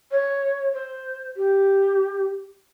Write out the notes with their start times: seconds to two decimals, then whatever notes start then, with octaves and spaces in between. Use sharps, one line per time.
0.11 C#5
0.73 C5
1.36 G4